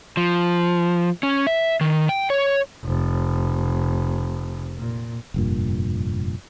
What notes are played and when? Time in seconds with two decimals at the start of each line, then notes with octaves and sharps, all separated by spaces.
0.17 F3
1.23 C#4
1.47 E5
1.81 D#3
2.09 G5
2.30 C#5
2.84 F1
4.78 A#2
5.34 F1 G2 A#2